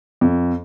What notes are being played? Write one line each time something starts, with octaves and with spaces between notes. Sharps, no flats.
F2